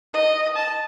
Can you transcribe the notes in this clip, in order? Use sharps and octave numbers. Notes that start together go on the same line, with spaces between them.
D#5
A5